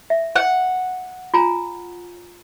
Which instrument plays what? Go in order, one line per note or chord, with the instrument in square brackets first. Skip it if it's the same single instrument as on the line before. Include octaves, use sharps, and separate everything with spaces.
[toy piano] E5
[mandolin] F#5
[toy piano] F4 G#5 A#5